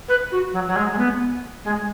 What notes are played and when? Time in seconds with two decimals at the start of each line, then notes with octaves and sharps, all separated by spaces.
0.08 B4
0.32 F#4
0.53 F#3
0.67 F#3
0.76 G#3
0.92 G#3
0.98 B3
1.64 G#3